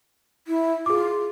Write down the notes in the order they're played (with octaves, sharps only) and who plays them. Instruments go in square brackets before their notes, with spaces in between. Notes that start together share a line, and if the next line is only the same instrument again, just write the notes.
[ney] E4
[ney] F4 [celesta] G#4 D6